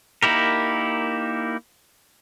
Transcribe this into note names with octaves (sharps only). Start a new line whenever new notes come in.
A#3 D#4 E4 G4 A#4